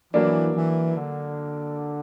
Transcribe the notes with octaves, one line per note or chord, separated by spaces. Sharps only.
E3 F#3 A#3 D4
E3
D3